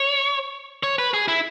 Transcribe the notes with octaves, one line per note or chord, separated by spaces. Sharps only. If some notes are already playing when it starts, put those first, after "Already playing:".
Already playing: C#5
C#5
B4
G#4
E4